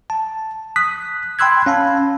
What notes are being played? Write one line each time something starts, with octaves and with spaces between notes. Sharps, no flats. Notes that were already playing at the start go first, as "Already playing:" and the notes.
A5
D#6 F#6 B6
G5 B5 C6 E6 F#6 G#6
C#4 F5 A5 B5